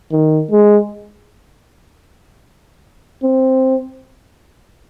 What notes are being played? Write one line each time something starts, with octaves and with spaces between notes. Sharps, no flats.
D#3
G#3
C4